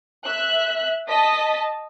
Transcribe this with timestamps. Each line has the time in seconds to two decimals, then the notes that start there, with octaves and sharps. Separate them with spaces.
0.25 E5 F#6
1.08 D#5 A5 B6